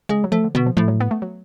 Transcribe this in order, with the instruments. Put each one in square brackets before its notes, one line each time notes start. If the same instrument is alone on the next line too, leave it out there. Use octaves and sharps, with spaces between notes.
[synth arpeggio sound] C#3 [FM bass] G#3
[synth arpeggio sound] F#3
[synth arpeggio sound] F3 [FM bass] A3
[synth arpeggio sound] D3
[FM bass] B2 [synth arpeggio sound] D3
[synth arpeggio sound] F3
[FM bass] A2 [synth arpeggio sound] F3
[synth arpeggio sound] F#3
B3
A3
F#3